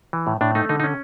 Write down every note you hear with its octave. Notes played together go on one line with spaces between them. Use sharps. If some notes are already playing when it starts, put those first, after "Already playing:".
E3
A2
A2 D4
A3 D#4
D3 D#4
D#4
C#4